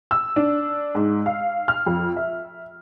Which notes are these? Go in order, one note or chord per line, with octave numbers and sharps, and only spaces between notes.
E6
D4
G#2
F5
F6
F2
E5